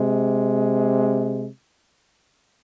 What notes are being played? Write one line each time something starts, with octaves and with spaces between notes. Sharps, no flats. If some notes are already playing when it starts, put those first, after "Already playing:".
Already playing: C3 G#3